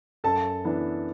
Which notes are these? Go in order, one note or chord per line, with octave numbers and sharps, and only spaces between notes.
F#2 A4 A5
E3 B3 D4